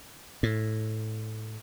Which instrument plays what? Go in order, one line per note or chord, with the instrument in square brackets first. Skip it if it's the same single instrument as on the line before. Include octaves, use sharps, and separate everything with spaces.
[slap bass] A2